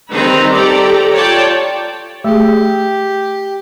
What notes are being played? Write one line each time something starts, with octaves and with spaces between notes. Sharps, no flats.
D#3 G3 C4 D#4 B4 A#5
G4 A4 D5 A#5
F4 C#5 D5 G5 A5
A3 G4 G#4